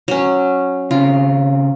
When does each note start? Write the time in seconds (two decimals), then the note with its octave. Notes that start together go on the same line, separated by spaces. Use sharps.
0.08 F#3 C#4
0.91 C#3 C4 F4